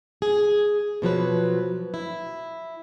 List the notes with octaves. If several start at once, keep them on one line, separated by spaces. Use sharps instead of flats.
G#4
B2 F3 F#3 B4
E4